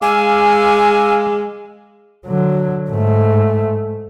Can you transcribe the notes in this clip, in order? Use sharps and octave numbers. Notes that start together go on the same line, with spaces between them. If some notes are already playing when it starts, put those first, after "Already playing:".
G#3 F5 G#5 D6 E6
D3 F#3
G#2 A3